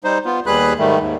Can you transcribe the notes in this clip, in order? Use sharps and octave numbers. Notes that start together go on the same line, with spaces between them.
G3 D#4 C5
B3 F4
D#2 G3 G#4 B4 B5 F#6
G#2 D#3 G3 A3
D#2 G#2